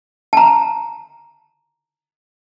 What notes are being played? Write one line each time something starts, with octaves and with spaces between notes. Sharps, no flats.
A5 A#5